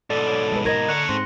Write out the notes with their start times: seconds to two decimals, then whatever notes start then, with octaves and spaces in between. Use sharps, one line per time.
0.10 G#2 B2 A4 D5
0.27 C#5 D7
0.52 G#3 B4
0.65 A#4 C5 D#5 A#5 G#6 A#6
0.89 D3 A4 C#5 F#6 C#7
1.09 G#2 C4 C6 A#6